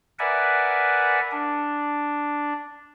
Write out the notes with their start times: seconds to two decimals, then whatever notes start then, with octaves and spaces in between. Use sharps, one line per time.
0.19 A#4 B4 D5 E5 F#5 G#5
1.32 D4